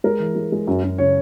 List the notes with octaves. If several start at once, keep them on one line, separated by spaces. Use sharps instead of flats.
G#3 A#4
E3
G#3
G#3
F#2
F#2
C#3 C#5